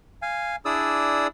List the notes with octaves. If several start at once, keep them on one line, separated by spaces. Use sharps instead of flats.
F5 G#5
D4 E4 G#4 D5 D#6 E6